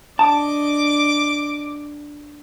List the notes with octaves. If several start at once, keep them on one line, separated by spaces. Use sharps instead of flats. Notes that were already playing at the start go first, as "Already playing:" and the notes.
D4 D#5 A5 D6